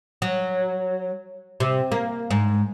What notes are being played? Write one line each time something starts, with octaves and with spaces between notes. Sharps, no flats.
F#3
C3
A#3
G#2